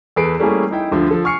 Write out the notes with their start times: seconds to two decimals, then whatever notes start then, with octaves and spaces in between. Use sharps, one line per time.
0.16 E2 G#4 A4 B4 C7 D7
0.40 G3 A3 A#3 C#4 E4 G#4
0.71 D#4 E4 G5
0.92 D2 D3 F3
1.11 F3 A4
1.24 G#5 C#6 F6 C7 C#7